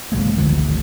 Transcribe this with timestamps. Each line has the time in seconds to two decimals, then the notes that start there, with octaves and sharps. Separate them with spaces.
0.12 F1 G2 G#3 A#3
0.38 G#1 D2 D3 F3